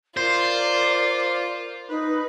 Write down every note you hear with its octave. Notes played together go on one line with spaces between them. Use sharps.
F4 A#4 C5 D5
D#4 B4